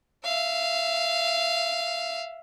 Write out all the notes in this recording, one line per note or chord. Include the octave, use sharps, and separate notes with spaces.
E5 F5